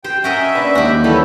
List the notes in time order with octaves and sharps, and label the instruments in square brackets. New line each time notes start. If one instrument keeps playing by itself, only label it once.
[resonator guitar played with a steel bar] G4 [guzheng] C5 [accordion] G5
[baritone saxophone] C#4 [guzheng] F#4 A#4 D#5 [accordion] E5
[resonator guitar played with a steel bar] A#3 D4 B4
[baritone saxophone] D#2 [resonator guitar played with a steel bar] G#3 [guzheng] F#4 G4
[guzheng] E3 [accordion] G3 E4 A4 [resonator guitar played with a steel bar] C#4 G4 B4